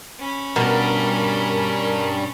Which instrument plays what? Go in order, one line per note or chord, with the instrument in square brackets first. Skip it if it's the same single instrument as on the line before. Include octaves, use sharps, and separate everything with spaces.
[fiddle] C#4 B5
[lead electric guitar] G2 G3 [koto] B2 [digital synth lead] A#4